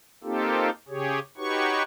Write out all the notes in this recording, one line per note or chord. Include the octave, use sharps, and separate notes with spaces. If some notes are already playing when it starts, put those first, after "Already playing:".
A#3 C4 D#4 F4 G4 A4
C#3 G4 G#4 C#5
D#4 F#4 G4 B4 C#5 C#6